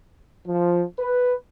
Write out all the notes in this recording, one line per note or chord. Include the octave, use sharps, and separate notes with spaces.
F3
B4